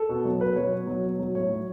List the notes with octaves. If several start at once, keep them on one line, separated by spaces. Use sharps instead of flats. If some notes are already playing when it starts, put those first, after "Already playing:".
Already playing: A4
B2
F#3
B2 B4
F#3 C#5
B2
F#3
B2
F#3
A2 C#5
F#3